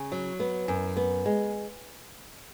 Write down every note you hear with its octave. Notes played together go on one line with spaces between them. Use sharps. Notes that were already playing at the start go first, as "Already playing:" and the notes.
Already playing: C#3
F#3
B3
F#2
B3
G#3